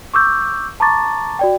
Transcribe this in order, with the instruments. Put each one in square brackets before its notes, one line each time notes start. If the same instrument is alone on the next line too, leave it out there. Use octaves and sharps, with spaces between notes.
[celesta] C#6 D6 E6 G6
A5 A#5 C#6 D6 A6
F#4 D5 G5